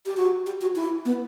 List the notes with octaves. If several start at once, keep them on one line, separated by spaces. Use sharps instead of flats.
G4
F#4
G4
F#4
E4
B3